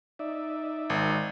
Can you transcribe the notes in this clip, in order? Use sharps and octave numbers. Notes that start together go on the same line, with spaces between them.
D#4 D5 E5
G#1